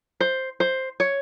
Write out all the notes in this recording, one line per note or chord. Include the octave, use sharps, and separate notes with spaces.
C5
C5
C#5